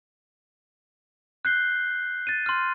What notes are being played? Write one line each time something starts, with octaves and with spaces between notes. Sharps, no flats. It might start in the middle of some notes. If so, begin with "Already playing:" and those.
F#6 G6 C7 G7
A6 D#7
C6 F6